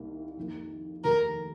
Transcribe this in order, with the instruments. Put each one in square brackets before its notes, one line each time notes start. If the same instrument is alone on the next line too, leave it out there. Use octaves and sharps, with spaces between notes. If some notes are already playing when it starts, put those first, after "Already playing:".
Already playing: [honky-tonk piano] C2 C3 D#3 A#3
F2 D#3 A#3
[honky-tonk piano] F1 D#2 D#3 A3 [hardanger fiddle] A#4